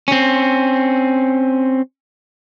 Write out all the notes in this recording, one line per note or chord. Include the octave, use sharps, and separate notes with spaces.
C4 C#4